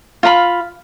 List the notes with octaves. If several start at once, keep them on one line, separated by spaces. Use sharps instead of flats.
F4 F5 A#5 B5